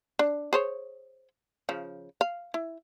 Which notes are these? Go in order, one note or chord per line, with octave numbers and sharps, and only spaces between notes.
D4
G#4 C5 C#5
C#3 F3
F5
E4